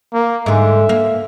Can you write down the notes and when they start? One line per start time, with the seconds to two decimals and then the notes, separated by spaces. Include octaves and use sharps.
0.13 A#3
0.46 G#2 D3 E5
0.89 A#3